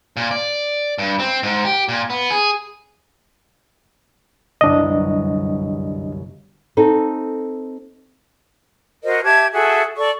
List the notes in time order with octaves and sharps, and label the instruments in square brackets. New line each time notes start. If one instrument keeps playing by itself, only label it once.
[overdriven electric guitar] A#2
D5
G2
C4
G#2
G4
A#2
B3
G#4
[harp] G1 C2 F#2 [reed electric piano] D4 D#5
[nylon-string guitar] C4 D#4 A4
[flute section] F#4 A#4 C5 D#5
G4 E5 A5 G#6
F#4 G#4 A4 E5
A4 D5 C#6